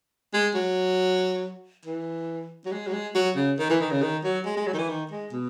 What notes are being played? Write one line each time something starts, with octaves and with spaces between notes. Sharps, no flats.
G#3
F#3
E3
F#3
G#3
F#3
G#3
F#3
C#3
D#3
E3
D#3
C#3
D#3
F#3
G#3
G#3
F#3
D#3
E3
D#3
G#3
B2